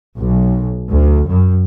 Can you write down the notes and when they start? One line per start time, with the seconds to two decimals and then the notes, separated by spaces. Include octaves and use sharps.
0.18 B1
0.89 D2
1.27 F#2